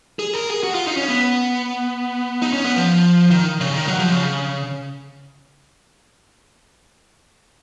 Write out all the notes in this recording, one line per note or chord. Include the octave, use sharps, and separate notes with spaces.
G#4
A#4
G#4
F#4
F4
D#4
C#4
B3
D#4
C#4
B3
F3
D#3
C#3
D#3
F#3
F3
C#3